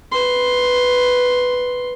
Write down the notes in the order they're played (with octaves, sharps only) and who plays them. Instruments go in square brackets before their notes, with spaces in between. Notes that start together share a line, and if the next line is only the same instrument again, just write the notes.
[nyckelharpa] B4 C6